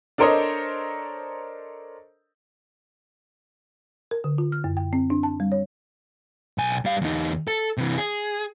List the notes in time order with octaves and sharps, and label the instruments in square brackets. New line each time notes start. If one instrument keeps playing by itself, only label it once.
[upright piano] D4 A4 A#4 C5 C#5 D#5
[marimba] A#4
D3
F4
F6
F#2
G5
C4
D4
A5
G3
C#5
[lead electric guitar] B1 G#5
G3 F5
E2 D#4
A4
C3 E3
G#4